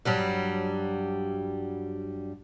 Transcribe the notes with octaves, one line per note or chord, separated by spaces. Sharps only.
G2 F#3 G3